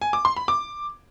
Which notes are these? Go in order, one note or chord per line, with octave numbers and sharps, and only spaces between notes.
G#5
D6
C6
B5
D6